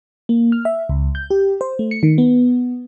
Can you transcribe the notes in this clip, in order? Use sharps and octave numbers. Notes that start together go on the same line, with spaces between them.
A#3
F6
E5
C#2
G6
G4
C5
A3
C#7
D#3
B3